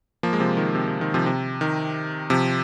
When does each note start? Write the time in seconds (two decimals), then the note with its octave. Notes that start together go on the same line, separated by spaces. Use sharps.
0.23 F3 A#3
0.33 G#3
0.40 C3 F3
0.57 D#3
0.75 C3
0.87 C3
1.01 D#3
1.14 C3 F3
1.26 C3
1.61 D#3
2.30 C3 F3